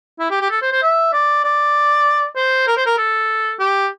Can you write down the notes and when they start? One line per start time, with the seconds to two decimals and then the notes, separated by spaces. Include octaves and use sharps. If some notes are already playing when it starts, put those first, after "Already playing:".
0.20 E4
0.31 G4
0.41 G4
0.51 A4
0.62 C5
0.72 C5
0.82 E5
1.13 D5
1.44 D5
2.36 C5
2.67 A#4
2.77 C5
2.86 A#4
2.98 A4
3.59 G4